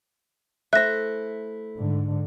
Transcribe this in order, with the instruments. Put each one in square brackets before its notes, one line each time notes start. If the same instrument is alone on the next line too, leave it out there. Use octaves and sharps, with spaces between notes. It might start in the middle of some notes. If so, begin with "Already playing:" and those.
[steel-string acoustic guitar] A3 E4 [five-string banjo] C5 E5 [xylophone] F#6 A#6
[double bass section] G#2 D3